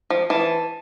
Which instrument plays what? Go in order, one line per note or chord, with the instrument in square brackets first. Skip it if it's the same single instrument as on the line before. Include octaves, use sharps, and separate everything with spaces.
[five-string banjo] F3
[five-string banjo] E3 [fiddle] A5